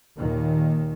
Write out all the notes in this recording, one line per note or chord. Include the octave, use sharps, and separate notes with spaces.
D#2 A#2 D#3 A#3